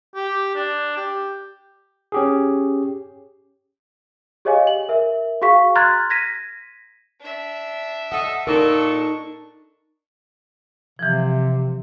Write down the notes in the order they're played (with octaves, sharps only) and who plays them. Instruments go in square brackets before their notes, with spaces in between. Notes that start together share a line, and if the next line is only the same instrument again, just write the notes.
[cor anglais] G4
D4
G4
[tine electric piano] C#4 G4 G#4
[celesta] G4 G#4 C#5 D#5 F5 G#5
F#7
A#4 E5
F#4 G#4 F5 C#6 B6
A#5 C6 F6 F#6 G#6 A6
G#6 A#6 B6 D#7
[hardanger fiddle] D4 E5
[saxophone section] A4 D#5 [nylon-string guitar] F#5
[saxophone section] A#2 A4 [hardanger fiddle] D4 C#6 [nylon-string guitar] D#4 A#4
[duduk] C3 [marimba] E3 F3